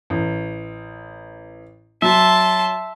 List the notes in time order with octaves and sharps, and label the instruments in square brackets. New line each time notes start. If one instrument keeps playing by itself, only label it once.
[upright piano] A1
[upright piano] F#3 [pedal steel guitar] E5 [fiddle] A5 C6